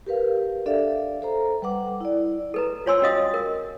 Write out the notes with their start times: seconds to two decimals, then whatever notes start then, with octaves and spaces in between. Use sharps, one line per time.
0.07 G4 A#4 B4 F5
0.66 D4 A4 D5 E5 F5
1.22 A4 C5 A#5
1.62 G3 B4 F#5 D6
2.01 E4 D5
2.54 A4 B4 A#5
2.86 F4 C5 C#5 G#5 C6 E6
3.02 C#4 F#4 D#5 F5 D#6
3.34 A#4